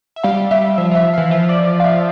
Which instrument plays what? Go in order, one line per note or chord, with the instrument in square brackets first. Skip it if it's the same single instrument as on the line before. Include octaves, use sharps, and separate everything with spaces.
[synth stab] E5
[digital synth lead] G3 [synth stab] F5
[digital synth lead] G3 [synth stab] E5
[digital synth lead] F3 [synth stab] E5
[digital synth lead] F3 [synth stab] E5
[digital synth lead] E3 [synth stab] F5
[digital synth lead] F3 [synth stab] E5
[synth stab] D5
F5
E5